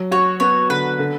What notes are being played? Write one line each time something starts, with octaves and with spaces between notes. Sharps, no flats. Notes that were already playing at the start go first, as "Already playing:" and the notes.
Already playing: F#3
F#4 C#5
B3 C#5
D3 B4
D3